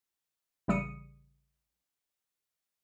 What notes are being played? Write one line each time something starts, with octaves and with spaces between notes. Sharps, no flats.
A1 C#3 G3 D#6 C#7 D#7